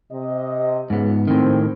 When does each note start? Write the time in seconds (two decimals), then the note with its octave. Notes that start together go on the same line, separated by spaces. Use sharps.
0.12 C3 D#5
0.90 C#2 G#2 B3
1.27 A2 D#3 C4